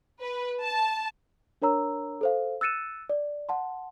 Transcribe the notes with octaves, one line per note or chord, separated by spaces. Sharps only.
B4
A5
D4 A#4 C#5 A#5 E6
A4 C5 F5
E6 F#6 A6 C#7 D#7 E7
D5
F#5 A5 C6